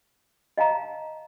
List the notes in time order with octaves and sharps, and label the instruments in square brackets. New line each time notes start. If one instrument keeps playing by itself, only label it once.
[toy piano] D#5 F5 A5 A#5